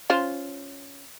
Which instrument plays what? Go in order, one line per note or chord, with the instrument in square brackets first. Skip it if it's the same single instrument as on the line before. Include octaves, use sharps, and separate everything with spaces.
[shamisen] C#4 F4 C5